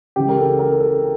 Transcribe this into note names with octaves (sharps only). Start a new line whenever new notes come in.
C#2 C#3 E3 G#3 G4
A#4
A4
A#4
A4